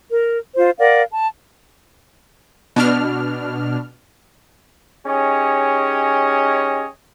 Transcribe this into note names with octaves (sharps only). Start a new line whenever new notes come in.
A#4
F4 C5
A#4 D5 F5 F#5
A5
B2 D4 F6
C#4 D#4 G4 G#4 C#5 D#5